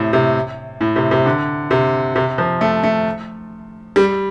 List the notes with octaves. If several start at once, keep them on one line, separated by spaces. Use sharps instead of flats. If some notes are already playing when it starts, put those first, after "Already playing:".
Already playing: A2 C3
C3
A2
C3
C3
D3
C3
C3
F3
A3
A3
G3